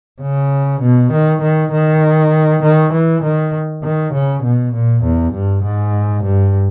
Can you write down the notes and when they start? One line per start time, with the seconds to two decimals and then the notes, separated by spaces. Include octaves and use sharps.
0.21 C#3
0.81 B2
1.12 D#3
1.42 D#3
1.72 D#3
2.63 D#3
2.93 E3
3.23 D#3
3.83 D#3
4.13 C#3
4.43 B2
4.74 A#2
5.03 E2
5.33 G2
5.64 G#2
6.24 G2